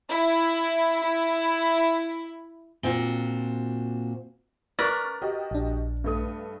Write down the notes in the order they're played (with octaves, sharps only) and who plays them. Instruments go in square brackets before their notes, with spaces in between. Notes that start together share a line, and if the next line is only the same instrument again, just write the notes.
[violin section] E4
E4
[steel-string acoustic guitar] A#2 C4 D4 F#4
[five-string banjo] A#4 B4 D5 [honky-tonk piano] C#6 F6 A6
[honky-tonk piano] F#4 G4 D#5
[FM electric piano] A#1 D4
[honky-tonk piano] G2 A3 D#6